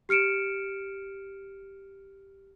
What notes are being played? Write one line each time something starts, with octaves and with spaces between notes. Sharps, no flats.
G4 F6 C#7 D7 E7